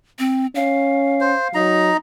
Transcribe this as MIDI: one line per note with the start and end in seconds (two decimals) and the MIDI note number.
0.19 0.47 60
0.55 1.34 61
0.55 1.59 77
1.21 1.48 72
1.54 1.91 54
1.54 1.97 63
1.54 1.97 82